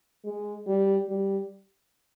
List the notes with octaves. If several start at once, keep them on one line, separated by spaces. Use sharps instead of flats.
G#3
G3
G3